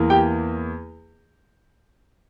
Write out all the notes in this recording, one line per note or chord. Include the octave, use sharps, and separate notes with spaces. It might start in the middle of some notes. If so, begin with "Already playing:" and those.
Already playing: E2 E3 A#3
G4 G5